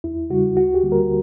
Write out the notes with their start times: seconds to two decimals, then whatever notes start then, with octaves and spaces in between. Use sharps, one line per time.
0.04 E2 E4
0.30 C#3 G3 F#4
0.57 D2 F#4
0.75 G4
0.83 D3 G3 A#3
0.92 A#4